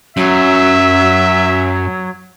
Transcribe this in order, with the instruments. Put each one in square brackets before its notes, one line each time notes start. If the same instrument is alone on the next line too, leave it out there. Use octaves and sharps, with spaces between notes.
[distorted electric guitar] F#2 [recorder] F#3 [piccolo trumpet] E5